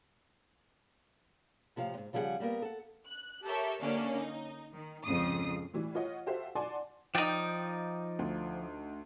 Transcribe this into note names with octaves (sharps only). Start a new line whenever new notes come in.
A2 C3 F3 A#4 F5
D2 G#2
C#3 F3 G3 E4 G#4 F#5
G3 A#3 B3 A#4
A4 F#5
F#6
G4 A4 A#4 C#5 E5
D3 A#3 C#4 D4
D#4
D#3
G#1 F2 C#3 D#6 C7
A2 E3 G3
F4 C#5 D#5 F#5
F#4 G4 A4 C5 E5 F5
D5 F#5 G#5 A5 C6 D6
F3 D#4 D5 G5
D2